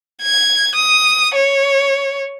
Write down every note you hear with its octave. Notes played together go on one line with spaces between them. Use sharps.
G#6
D#6
C#5